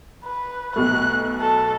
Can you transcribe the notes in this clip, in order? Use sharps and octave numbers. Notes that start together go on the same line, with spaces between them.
B4
B1 B2 A3 F#6
A4